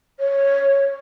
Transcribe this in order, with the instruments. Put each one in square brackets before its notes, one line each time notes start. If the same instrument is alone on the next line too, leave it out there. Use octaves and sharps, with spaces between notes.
[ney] C#5